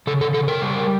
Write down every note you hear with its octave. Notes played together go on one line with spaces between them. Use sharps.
C#3 A4
A4
C#3 A4
A#4
G3